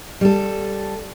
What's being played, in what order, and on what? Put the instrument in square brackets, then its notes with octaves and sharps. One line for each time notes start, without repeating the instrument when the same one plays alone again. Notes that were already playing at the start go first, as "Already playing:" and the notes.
[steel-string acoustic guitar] G3 A4